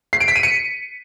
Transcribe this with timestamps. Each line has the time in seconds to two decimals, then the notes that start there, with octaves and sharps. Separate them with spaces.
0.13 C7
0.20 D7
0.28 B6
0.36 D#7
0.43 C#7